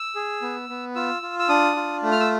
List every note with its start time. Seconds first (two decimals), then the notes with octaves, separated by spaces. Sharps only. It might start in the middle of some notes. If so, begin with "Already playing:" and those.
Already playing: E6
0.15 G#4
0.42 B3
0.69 B3
0.96 F4 E6
1.22 F4
1.39 E6
1.49 D4 D#6
1.76 F4
2.03 A3
2.12 F6
2.20 E6